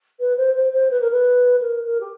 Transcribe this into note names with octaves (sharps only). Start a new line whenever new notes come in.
B4
C5
C5
C5
B4
A#4
B4
A#4
A#4
G4